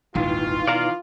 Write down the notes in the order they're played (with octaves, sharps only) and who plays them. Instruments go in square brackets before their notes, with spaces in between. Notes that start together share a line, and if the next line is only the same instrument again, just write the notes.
[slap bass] D#1 G#1 E2 [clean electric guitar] D#3 E3 [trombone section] F4
[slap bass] B2 [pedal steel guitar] D5 F5 A#5